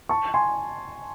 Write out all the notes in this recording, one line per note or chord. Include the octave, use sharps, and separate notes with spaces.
A5 C#6
G#5 C6